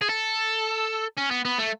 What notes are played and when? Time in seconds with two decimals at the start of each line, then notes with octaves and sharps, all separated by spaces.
0.02 G#4
0.09 A4
1.18 C#4
1.31 B3
1.45 B3
1.58 A3